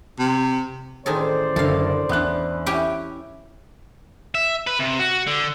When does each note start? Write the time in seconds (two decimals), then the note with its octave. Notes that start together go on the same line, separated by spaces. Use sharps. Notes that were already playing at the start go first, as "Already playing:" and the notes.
0.19 C3
1.06 A1 D#3 G#4 A4 C5 D5
1.56 F#1 D3 A4 F5
2.09 E2 B3 D4 F#6
2.66 C#4 E4 G4
4.35 E5
4.67 B4
4.79 C3
4.99 F#4
5.27 D3